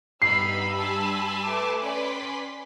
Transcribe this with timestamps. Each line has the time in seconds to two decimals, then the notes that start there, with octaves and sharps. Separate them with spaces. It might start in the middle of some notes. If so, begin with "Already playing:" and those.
0.22 G2 G3 B3 D#4 B5 E6 C7
0.76 G#5 A5 C6
1.44 A3 B4 D6
1.80 C#4 B4 D5 G5 B5 C6 B6